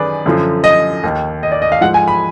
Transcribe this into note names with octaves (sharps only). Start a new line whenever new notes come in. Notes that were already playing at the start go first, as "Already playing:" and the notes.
Already playing: F#2 D#3 G#4 B4 D5
F#2 D3 F3
D#5
D#2 D#3
D#5
D5
D#5
F5
G#2 F3 F#5
G#5
B5